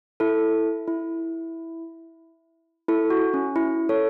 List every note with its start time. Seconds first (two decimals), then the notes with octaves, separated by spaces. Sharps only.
0.20 E4 A4
0.88 E4
2.88 E4 A4
3.10 F#4
3.34 C#4
3.56 E4
3.89 A4 C#5